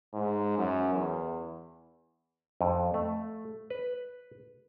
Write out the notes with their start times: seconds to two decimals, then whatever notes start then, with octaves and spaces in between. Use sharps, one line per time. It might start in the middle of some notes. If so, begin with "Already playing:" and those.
0.13 G#2
0.58 F#2
0.94 E2
2.61 F2
2.94 A3
3.70 B4